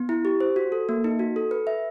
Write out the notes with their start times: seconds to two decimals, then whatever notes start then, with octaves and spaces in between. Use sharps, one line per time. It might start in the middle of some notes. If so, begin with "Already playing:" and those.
Already playing: B3
0.09 E4
0.25 G4
0.40 C5
0.56 F#4
0.72 A4
0.89 A#3
1.04 D#4
1.19 F#4
1.36 A4
1.51 B4
1.67 E5